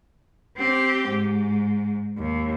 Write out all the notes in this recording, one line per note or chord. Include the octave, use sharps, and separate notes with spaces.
C4 G4
G#2
D#2